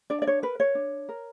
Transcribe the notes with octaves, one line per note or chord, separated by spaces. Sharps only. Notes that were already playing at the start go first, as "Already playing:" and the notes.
D4 D5
D5
C#5
A#4 B4
C#5
D4
A#4